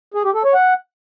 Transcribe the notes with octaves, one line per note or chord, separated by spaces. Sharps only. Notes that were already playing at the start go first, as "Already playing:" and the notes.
G#4
G4
A4
C#5
F#5